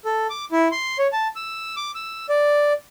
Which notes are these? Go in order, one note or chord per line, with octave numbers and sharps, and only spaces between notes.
A4
D6
E4
C6
C#5
A5
E6
D6
E6
D5